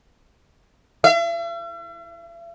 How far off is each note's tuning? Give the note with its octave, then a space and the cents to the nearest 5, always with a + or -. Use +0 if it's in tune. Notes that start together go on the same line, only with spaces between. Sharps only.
E5 +45